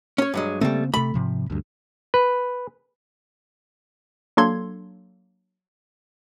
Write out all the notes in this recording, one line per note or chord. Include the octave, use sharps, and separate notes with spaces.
C#4 C#5
G2 F#3 G#3
C#3 G3 A3 A#3 C4
C3 A3 B5
G#2 C3 F3
D2 G2
B4
F#3 A#3 D4 A4 C6 G#6